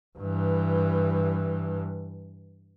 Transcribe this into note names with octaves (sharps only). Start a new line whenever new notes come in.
G2 E3